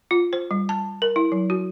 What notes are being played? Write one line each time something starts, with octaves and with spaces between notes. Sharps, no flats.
F4
C5
G3
A5
A#4
E4
F#3
F#4